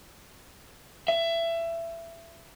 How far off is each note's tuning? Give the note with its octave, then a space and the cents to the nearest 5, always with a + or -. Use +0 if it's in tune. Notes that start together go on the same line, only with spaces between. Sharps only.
E5 +20